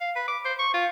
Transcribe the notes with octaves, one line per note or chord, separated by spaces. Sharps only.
F5
B4
D6
C5
C#6
F4